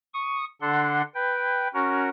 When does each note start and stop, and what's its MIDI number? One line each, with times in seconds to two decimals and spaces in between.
0.14 0.45 85
0.14 0.45 87
0.61 1.02 50
0.61 1.02 62
0.61 1.02 69
0.61 1.02 78
0.61 1.02 84
1.15 1.68 71
1.15 1.68 79
1.74 2.09 61
1.74 2.09 66
1.74 2.09 70